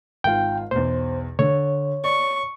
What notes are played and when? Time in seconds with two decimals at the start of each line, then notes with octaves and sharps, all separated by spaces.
0.24 G#1 F4 G5
0.71 B1 E2 C5
1.39 D3 C#5
2.04 D5 C#6